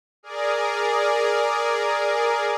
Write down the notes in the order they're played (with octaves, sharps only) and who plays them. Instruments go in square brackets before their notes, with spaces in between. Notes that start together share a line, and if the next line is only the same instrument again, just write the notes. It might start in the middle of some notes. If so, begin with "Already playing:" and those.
[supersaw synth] G#4 A#4 D5